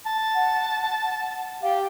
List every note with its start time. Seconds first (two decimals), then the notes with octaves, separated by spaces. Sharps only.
0.06 A5
0.35 F#5
1.62 G4 F5